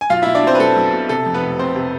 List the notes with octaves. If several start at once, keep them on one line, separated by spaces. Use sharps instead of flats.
G#5
B1 F4 F5
B2 E4 E5
D4 D5
B2 C4 C5
B4
B1 A4
B1
B2
C3 A4
F2
B3 B4
F1
F1 C4 C5
C3